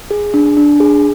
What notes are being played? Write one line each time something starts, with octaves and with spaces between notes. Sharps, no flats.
G#4
D4
D4
G#4